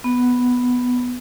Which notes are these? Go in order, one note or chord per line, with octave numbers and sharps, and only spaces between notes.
B3